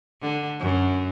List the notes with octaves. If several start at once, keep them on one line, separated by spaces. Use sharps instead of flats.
D3
F#2